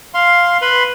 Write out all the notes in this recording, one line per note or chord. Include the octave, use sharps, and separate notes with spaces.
F5 C6
B4 B5 C6